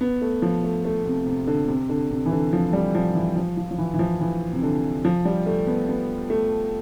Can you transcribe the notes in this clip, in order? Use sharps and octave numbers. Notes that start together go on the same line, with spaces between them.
B3
A3
F3
A3
A3
C3
C3
D3
C3
D3
C3
E3
D3
F3
G3
F3
E3
F3
F3
F3
E3
E3
F3
E3
C3
D3
F3
G3
A3
B3
B3
A3